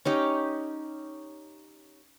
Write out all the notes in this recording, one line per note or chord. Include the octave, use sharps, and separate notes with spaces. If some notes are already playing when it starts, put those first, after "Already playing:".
C#4 D#4 G4